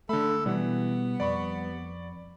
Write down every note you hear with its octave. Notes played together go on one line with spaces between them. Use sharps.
D3 A3 A4 B5
B2 E3 G3 B3
F2 D5 B5 C#6